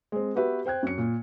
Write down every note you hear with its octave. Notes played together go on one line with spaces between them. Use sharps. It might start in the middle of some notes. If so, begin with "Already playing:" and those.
G#3 C4
B3 F#4 G4 B4 E5
C5 G5 F#6 G#6
F#2 C#7
A#2